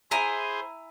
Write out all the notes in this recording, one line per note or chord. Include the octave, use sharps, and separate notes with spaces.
E4 G#4 C5 G#5 A#5